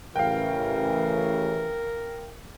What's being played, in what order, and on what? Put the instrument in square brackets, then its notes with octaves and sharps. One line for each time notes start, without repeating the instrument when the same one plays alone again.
[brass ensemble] A1 C#3 E3 [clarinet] A#4 [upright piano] F5 G5